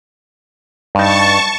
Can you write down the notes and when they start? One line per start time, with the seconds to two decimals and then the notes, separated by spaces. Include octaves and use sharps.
0.95 G2 D#4 A5 C#6